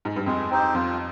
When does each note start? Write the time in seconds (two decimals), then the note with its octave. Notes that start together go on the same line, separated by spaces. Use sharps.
0.05 G#2
0.16 G2
0.26 F2 G#3
0.51 C4 D#4 G4 C5
0.74 F2 F4